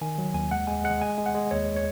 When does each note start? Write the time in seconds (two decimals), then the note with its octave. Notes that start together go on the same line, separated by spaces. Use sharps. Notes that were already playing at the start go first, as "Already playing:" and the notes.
0.01 D#3 G#5
0.18 F#3
0.34 D#2 G#5
0.51 G#3 F#5
0.67 G#3 G#5
0.84 G#3 F#5
1.02 G#3 G#5
1.18 G#3
1.26 F#5
1.34 G#3
1.51 D#2 C#5
1.76 C#5